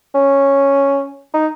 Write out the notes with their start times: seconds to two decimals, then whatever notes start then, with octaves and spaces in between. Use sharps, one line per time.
0.15 C#4
1.34 D#4